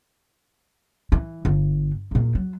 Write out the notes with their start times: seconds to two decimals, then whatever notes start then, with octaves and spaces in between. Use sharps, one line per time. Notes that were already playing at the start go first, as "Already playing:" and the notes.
1.12 E3
1.45 G1
2.11 E2 A#2
2.35 F#3